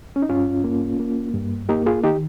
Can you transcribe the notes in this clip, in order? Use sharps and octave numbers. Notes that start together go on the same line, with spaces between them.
C#4
D#4
G2 C#4 F4
A#3
A#3
G2
A#3 D#4 G4
F4 G#4
D#3 D#4 G4